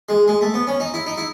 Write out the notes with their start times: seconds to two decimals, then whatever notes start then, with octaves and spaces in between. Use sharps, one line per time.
0.09 G#3
0.28 G#3
0.41 A3
0.54 B3
0.67 C#4
0.80 D#4
0.94 E4
1.06 D#4
1.18 E4